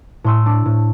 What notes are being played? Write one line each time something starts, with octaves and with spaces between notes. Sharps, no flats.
A2 C6 E6
D4
A2